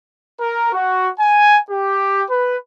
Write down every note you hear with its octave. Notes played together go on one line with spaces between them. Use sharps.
A#4
F#4
G#5
G4
B4